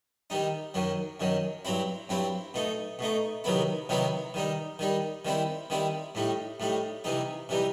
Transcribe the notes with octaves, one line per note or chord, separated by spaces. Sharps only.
D#3 G3 D#4
F#2 D#3 F#3
F#2 D#3 F#3
G2 F#3 C4 E4
G2 F#3 C4 E4
B2 A3 D#4
B2 A3 D#4
C3 D#3 F#3 B3 E4
C3 D#3 F#3 B3 E4
D#3 G3 D#4
D#3 G3 D#4
D#3 G3 C4 E4
D#3 G3 C4 E4
A2 G3 D#4
A2 G3 D#4
C3 E3 G3 D#4
C3 E3 G3 D#4